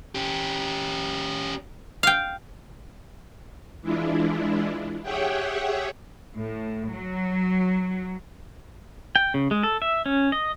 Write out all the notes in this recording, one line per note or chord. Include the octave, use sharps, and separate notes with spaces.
C#4 G4
F5 G5
E3 G#3 D4 E4 F4
G4 G#4 C#5 E5 F#5 G5
A2
F#3
G5
C#3
G#3
A4
E5
C#4
D#5